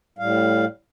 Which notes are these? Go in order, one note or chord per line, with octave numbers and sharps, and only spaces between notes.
A2 G3 F5